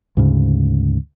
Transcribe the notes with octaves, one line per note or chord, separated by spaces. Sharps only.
D2 G#2 C#3